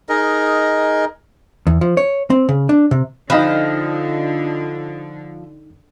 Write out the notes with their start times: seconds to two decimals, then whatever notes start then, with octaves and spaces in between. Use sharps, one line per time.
0.09 D#4 G#4 A#4 D#5
1.67 E2
1.81 F3
1.97 C#5
2.30 C4
2.49 C#3
2.69 D4
2.91 C3
3.30 D3 F3 D#4 D#5 F5 G5 B5 F#6